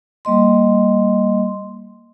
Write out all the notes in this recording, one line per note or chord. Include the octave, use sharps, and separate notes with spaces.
G3 A#3 D#5 C6